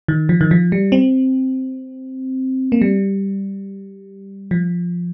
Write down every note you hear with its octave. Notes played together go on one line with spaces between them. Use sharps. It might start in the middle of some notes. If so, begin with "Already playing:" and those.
D#3
F3
D#3
F3
G3
C4
A#3
G3
F3